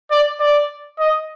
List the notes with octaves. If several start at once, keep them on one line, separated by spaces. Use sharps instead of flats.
D5
D5
D#5